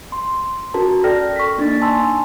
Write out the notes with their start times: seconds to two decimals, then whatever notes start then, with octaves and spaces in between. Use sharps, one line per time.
0.12 C6
0.74 C#4 F#4 A#4 A5 A#5
1.04 A4 D5 G5 F6 A#6
1.36 C#6 B6
1.58 A#3 D4 D#4 D5 A6
1.81 G#5 A5 C6 E6